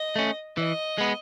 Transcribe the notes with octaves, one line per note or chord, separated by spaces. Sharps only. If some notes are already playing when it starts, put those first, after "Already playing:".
Already playing: D#5
A3 C#4
E3 D#5
G#3 B3